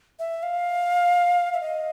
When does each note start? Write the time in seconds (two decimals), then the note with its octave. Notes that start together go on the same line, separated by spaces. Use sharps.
0.19 E5
0.43 F5
1.53 E5
1.61 D#5